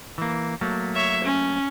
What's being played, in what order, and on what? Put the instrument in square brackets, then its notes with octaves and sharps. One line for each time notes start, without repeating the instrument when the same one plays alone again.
[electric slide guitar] E3 A#3
F#3 A3 A#3
[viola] C#5 E5
C#4